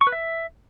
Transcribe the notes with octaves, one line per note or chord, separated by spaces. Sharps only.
C#6
B4
E5